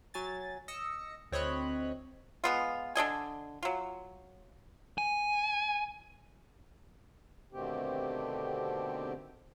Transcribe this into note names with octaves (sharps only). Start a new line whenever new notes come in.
F#3 G#5 A6
D#5 E6 A#6 C#7
D2 C4 C#5 D#5 B5 F#6
G#3 B3 F4
D3 D4 D#5 G#5
F#3 F4
G#5
B2 D3 D#3 A3 C4 G4